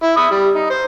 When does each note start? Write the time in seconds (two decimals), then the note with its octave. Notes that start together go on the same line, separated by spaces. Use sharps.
0.03 E4
0.17 E5 B5 D#6
0.31 G3
0.54 D#4
0.70 C5